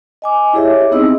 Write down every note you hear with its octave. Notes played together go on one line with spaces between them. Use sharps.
D#5 G#5 D6
E4 G4 G#4 C#5 E5
B3 C4 D#4 G#4 D#5 E6